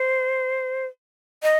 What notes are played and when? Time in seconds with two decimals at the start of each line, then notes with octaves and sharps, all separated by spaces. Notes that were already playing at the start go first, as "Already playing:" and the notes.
Already playing: C5
1.43 D#5